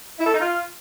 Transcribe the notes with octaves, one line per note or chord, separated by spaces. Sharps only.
E4
A4
D#4
F4